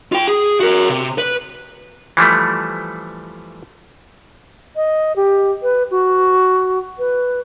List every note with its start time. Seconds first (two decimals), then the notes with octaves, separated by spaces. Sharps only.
0.12 F4 G5
0.28 G#4
0.60 F#4 A#4
0.89 C3
1.18 B4
2.17 E3 F3 G3 A3
4.76 D#5
5.16 G4
5.62 B4
5.91 F#4
6.98 B4